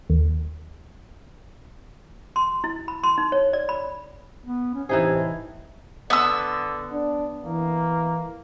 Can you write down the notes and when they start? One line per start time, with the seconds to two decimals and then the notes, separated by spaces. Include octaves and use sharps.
0.10 D#2
2.36 C6
2.64 E4
2.88 B5
3.03 C6
3.18 D#4
3.32 C#5
3.53 D5
3.69 B5
4.44 B3
4.74 C#4
4.89 A2 C3 E3 D#4 G#4
6.10 D3 B3 E6
6.92 D4
7.45 E3 A#3